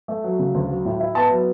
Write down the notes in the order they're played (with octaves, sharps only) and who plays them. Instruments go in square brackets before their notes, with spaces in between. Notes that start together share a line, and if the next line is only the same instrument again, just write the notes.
[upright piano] A3
F#3
C#3
D2
F#3
A2
E4
B3 A5
F#3